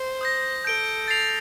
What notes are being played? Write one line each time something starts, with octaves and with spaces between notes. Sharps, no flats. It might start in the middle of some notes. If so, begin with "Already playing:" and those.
Already playing: C5
D#6 G6 A#6
A4 G6 D7 G7
A6 C7 F7